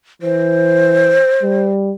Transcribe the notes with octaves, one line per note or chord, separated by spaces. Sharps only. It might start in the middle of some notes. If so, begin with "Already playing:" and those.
E3 C5
G3